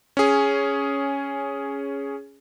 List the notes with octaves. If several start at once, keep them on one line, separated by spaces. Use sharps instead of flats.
C#4 G#4